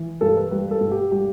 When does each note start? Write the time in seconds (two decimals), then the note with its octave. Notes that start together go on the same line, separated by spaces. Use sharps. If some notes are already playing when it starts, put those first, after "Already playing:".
Already playing: E3
0.21 G2 A4
0.36 B4
0.51 G3 B4
0.71 A4
0.81 G2
0.91 G4
1.11 G3 G4